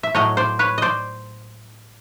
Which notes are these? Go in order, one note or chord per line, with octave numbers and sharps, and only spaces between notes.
E5
A2 F#3 A3 C#5 D#5
C5 D5
B4 C#5
C5 D5 D#5